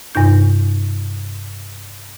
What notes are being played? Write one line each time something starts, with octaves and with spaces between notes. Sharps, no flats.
G2 C3 D#4 G6